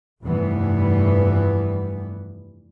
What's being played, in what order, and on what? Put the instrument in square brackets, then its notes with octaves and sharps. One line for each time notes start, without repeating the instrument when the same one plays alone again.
[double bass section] F1 G2 E3 G3 B3